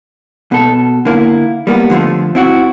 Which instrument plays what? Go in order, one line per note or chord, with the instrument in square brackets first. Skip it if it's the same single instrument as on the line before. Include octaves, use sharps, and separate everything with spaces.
[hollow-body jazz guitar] B2 A4
D3 A#3 E4
G3 A#3 B3
D3 F3 G3 A3
C4 E4 F#4